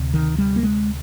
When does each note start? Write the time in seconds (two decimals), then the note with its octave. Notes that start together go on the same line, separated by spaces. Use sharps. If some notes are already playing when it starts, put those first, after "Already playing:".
Already playing: D2 C3
0.14 D#3
0.38 G3
0.56 A#3
0.63 G#3